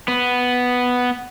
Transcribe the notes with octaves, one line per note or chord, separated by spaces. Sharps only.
B3